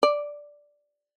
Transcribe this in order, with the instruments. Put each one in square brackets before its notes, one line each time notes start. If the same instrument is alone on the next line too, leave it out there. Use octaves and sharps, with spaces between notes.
[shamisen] D5